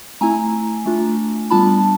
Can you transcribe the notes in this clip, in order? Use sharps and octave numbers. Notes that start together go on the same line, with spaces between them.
A3 C4 E4 G#5 A#5
A3 D4 F4
G3 B3 D4 F4 A5 B5